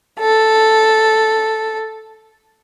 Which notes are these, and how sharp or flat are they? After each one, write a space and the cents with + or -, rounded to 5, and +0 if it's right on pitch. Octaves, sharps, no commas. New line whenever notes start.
A4 +0